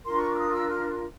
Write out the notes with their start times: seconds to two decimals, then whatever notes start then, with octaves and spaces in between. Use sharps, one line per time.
0.04 D4 F4 A#4 C6
0.17 C#6
0.29 D6
0.35 E6
0.40 D#6
0.52 E6
0.68 F6